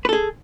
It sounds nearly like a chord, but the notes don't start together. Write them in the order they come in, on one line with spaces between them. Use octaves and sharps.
B4 A4 G#4